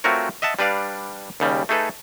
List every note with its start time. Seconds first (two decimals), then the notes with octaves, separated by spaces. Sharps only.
0.04 A3 C4 F4 F#4 A#4 C#5
0.42 D#5 E5 F#5 A5
0.59 G3 D4 B4 D5 F5
1.40 D#2 C#3 G3
1.69 A3 D#4 G#4 A4 B4